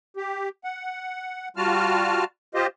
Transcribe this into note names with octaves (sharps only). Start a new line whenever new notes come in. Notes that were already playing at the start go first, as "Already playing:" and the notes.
G4
F#5
G3 F4 F#4 A5 F6
F4 G4 C5 D#5